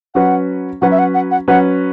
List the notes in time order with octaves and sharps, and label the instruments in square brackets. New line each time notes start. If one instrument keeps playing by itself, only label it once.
[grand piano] F#3 C#4 F#4 B4 [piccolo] F#5
[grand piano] F#3 C#4 F#4 B4 [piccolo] F#5
[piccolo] E5
F#5
F#5
F#5
[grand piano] F#3 C#4 F#4 B4 [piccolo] F#5